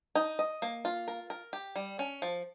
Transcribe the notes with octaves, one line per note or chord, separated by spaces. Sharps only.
D#4
D#5
A#3
F4
A#4
A#4
G4
G3
C#4
F3